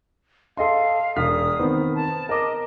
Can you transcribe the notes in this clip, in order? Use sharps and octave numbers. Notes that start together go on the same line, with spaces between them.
A4 D#5 F5 C6
E1 D#6 F6 B6
D#3 B3 C4
A5
A#4 D#5 D6